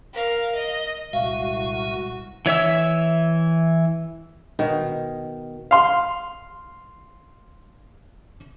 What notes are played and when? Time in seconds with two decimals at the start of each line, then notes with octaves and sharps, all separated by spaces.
0.13 A#4 F5
0.55 D#5
1.13 C2 A#2 G#3 F#4 E5 F5
2.46 E3 C#5 E5 E6
4.59 B2 D#3
5.71 F5 C6